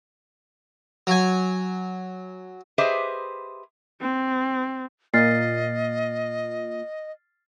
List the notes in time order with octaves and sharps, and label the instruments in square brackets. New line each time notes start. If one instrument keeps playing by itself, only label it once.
[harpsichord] F#3 G#5
[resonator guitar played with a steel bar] G4 G#4 B4 C5 D#5 E5
[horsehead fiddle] C4
[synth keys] A#2 [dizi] D#5 [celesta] F6 A6 C7